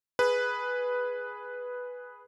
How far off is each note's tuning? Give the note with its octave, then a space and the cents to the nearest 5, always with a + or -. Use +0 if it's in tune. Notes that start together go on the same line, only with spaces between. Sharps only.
G#4 +0 B4 +0